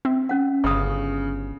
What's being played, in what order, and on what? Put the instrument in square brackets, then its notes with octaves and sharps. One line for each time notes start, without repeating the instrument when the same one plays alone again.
[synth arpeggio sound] C4 E5
[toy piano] C#4 F#5
[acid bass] G1 [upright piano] C#3 [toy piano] C#6 D#6